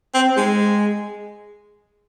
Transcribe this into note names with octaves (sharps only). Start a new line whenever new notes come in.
C4
G#3